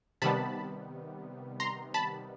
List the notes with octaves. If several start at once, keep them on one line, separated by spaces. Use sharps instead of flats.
C3 D#3 G3 B3 A5 B5
A#5 C6
A5 B5